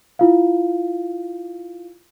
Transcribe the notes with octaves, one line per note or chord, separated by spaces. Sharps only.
E4 F4 F5